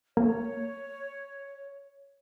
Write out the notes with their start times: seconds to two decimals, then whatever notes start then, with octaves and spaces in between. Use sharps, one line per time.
0.17 A#3 C#5